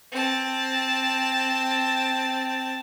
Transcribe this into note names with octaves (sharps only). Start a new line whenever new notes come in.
C4 A5